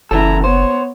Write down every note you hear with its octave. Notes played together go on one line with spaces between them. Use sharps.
F#1 C#3 E3 E4 A4 A#5
B3 C5 C#5